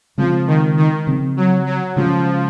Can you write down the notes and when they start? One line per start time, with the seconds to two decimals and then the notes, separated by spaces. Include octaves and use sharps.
0.18 C#3 F3 G#3 C4
0.47 D#3
0.77 D#3
1.07 C#3 F3 C4
1.37 F#3
1.66 F#3
1.96 C#3 F3 G#3 C#4